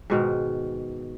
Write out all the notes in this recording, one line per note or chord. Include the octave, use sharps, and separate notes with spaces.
G#2 B2 D#3